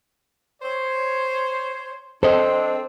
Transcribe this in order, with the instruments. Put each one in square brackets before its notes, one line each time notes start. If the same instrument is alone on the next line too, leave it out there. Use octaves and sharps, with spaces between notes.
[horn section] C5 C#5
[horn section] C4 D4 [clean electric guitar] A4 D#5 [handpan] C5